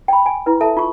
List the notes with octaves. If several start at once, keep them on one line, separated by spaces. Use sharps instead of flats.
G5 B5
G#5
E4 B4
A4 E5 A5
F4 C#6